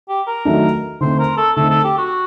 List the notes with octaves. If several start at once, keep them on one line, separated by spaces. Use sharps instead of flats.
G4
A#4
D#3 F#3 A3 D4
D3 A3 C4 D#4 C5
A#4
A4
D3 A3 C4 D#4 A4
A4
G4
F#4